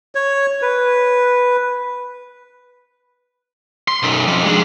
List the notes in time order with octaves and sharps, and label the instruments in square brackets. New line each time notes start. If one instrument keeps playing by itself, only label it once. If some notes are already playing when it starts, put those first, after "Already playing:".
[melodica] C#5
B4
[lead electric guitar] C6
B1 F#2
F2
G#3 D4